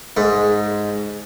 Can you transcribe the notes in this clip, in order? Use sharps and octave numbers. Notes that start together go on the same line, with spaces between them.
G#2